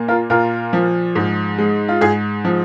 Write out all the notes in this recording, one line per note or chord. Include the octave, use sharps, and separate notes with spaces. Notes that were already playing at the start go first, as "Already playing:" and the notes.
Already playing: A#2 A#3
F4 A#4
A#2 F4 A#4
F3
G#2
G#3
F4
G#2 G#4
F3